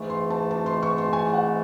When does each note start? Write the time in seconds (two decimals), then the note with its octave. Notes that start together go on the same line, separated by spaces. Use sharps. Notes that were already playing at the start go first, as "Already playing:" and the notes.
Already playing: G#2 E3 A3
0.10 C6
0.30 A5
0.51 A5
0.66 C6
0.83 C#6
0.98 C6
1.13 G#5
1.34 F#5